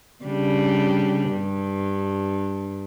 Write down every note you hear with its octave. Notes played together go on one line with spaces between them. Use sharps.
C#3 G3 D4
G2